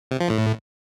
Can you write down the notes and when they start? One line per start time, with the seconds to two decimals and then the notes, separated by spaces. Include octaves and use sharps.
0.11 C3
0.21 F3
0.30 A2